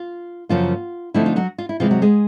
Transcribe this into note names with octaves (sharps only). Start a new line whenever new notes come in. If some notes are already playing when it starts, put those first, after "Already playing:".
Already playing: F4
F#2 C#3 F3 A#3 F4
D3 F3 A3 C4 D#4 E4
F4
F#3 F#4
F4
E4
C3 E3 G#3 F4
F#3 F#4
G#3 G#4